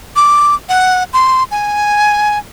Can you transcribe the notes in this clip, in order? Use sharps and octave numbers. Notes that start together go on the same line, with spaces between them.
D6
F#5
C6
G#5